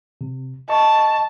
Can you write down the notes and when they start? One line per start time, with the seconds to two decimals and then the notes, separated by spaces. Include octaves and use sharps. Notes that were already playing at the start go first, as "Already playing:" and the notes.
0.21 C3
0.70 D#5 A5 C#6